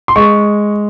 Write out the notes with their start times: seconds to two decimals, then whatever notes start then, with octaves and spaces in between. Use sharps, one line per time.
0.08 C6
0.16 G#3 C#6